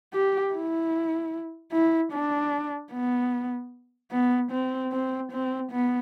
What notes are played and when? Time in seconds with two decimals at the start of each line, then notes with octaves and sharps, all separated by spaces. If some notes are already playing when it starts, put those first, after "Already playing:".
0.13 G4
0.53 E4
1.72 E4
2.12 D4
2.92 B3
4.11 B3
4.51 C4
4.92 C4
5.31 C4
5.71 B3